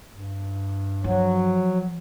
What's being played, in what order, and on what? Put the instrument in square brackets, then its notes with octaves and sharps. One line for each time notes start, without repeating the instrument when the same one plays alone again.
[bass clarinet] G2
[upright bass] F3 [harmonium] F#3